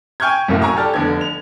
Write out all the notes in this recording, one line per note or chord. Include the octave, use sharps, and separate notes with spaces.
G5 G#5 C#6 F6 G6 G#6
F#1 F#2 A2 C3 F#3 A#3
G#5 A#5 C#6 E6
G4 A4 D5 A5 F6
F1 D3 B3 G#6
F7